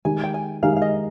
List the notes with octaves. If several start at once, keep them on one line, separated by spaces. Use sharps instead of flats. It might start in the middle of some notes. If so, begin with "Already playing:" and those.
D#3 G#3 D#4 G4 G#5
G5
G#5
D#3 G#3 D#4 G4 F5
F5
D#5